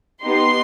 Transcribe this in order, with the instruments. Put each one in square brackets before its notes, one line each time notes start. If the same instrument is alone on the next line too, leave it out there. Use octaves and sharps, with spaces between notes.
[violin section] B3 D#4 G4 C6